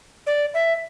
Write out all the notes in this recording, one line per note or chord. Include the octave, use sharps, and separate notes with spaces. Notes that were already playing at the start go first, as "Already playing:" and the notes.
D5
E5